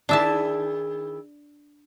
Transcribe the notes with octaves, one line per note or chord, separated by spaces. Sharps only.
D#3 D4 E4 G#4 E5 A5